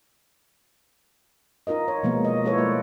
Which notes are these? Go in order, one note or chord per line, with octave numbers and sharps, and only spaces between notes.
D#4 F4 A#4 D#5
C#5
B2 F3 G#3 A#3 B3
D#5
G#3 E4 F4 A4 B4 C#5
A3 D5